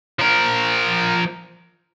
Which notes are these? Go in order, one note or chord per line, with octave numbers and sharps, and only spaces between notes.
F3 A#4